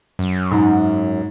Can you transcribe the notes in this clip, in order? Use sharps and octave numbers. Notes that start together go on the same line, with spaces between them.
F#2
G#2